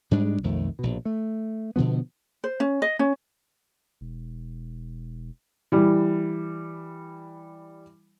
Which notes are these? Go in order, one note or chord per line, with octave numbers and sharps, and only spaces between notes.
G#2 G3 G#3 D4
B1 F2 D#3 A3
A#1 B2
A3
B2 D3 F3 B3
C5
C#4
D#5
C#4
E1
E3 G3